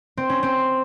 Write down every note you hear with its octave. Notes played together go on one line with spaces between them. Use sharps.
C4
C#4
C4